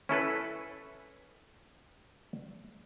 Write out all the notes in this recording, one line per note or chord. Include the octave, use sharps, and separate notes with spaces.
C#4 E4 A4 B4